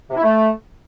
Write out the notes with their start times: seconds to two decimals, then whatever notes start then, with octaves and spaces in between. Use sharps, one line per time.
0.10 C3
0.17 E4
0.23 A3